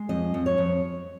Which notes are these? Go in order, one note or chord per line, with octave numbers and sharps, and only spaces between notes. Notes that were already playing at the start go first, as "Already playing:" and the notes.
Already playing: G#3
F2 D#5
F2
C#5
F2